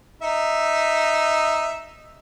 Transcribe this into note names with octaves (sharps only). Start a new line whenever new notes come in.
D#4 E5